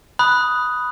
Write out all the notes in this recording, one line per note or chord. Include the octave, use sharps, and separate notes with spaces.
B5 D#6 F#6